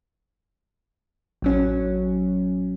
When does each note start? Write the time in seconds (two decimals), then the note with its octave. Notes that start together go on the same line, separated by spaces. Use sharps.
1.42 A1 F#3 C#4